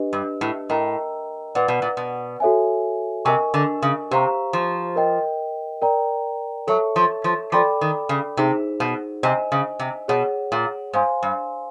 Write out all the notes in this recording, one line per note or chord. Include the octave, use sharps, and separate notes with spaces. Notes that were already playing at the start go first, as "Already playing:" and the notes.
Already playing: D4 G4 B4 D#5
G2
A2
A2 A#4 D#5 G5 A#5
A#2 B4 D5 F#5
B2
A#2
B2
F#4 A4 C#5 E5 G#5
C3 A#4 D#5 G#5 C#6
D3
C#3
C3 G4 C5 F5 A#5 C#6
F3
A#4 D#5 G5
A#4 D5 G5 A#5
F#3 A4 C#5 E5 A5 C#6
F3
F3
F3 A4 D5 G5 B5 D6
D#3
C#3
C3 D#4 G#4 C5
B2
C3 C5 D#5 G#5
C#3
C3
B2 G#4 C#5 F#5
A#2
G#2 C5 F5 G#5 C6
G2